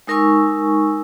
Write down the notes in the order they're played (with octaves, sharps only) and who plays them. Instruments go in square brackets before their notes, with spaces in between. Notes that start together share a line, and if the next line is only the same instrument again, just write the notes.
[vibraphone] G#3 D#4 A#4 G#5 C#6 E6